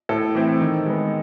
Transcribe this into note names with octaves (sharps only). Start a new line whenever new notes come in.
A2 A4
E3 A3 C4
D#3
G#3 B3